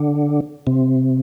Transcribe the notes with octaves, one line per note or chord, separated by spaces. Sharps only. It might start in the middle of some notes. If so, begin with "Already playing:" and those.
Already playing: D3
C3